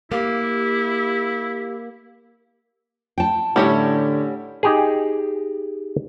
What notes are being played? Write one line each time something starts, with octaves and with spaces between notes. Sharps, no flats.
A#3 E4 G4
G5 A5
A2 D3 G3 C#4 E4 G4 C#5
D#4 G4 G#4